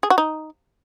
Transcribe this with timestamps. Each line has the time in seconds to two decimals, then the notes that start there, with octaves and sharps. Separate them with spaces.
0.03 G#4
0.10 F#4
0.18 D#4